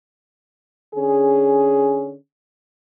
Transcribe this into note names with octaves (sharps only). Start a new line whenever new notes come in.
D3 C#4 G#4